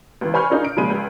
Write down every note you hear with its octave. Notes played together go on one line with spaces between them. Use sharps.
C#2 E3
C5 G#5 B5 C#6 F6 G6
D4 D#4 F4 A#4 C#5
D7
A#2 C#3 F3 G#3 B5 D#7
C#2